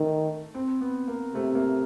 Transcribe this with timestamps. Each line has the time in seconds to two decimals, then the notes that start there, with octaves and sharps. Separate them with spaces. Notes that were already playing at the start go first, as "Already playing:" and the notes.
Already playing: D#3 A3
0.54 C4
0.81 B3
1.08 A#3
1.35 C3 A3
1.55 A#3